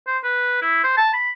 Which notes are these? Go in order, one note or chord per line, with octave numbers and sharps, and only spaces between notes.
C5
B4
E4
C5
A5
B5